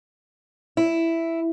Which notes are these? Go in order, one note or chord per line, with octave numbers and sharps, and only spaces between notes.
E4